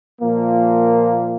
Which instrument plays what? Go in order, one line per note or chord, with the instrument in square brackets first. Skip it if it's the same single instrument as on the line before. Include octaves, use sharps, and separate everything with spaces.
[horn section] A#2 F3 A#3